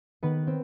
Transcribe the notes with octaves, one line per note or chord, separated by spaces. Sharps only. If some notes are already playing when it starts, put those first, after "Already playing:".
D#3 B3 B4
C4